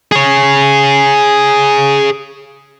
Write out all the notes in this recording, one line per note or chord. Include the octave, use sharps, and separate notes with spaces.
G#4 C#5